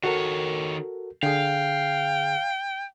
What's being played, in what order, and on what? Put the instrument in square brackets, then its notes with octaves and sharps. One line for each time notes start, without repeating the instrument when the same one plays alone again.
[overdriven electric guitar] D#3 C#5 [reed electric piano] F#4 A4 A#4
[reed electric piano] D3 G#4 [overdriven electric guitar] F5 [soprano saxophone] G5